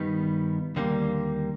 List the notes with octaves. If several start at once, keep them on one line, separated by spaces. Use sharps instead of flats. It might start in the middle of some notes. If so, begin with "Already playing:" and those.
Already playing: G2 D#3 G3 B3 D#4
D#2 D3 G3 A#3